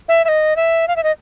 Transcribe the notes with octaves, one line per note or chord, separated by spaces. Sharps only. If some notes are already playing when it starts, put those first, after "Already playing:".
E5
E5
D#5
E5
F5
E5
D#5